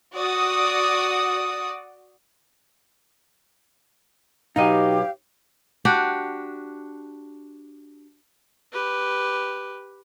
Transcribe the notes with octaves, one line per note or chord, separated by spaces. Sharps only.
F#4 D5 D#6
B2 F#3 D#4 G4 D#5 F5
D4 F#4 G4 D5
G4 B4